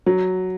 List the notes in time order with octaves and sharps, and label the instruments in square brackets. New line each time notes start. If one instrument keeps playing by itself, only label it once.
[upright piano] F#3